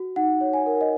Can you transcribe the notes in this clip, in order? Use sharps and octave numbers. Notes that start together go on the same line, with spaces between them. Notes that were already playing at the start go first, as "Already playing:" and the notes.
Already playing: F#4
D#4 F#5
C#5
G#5
A#4
D#5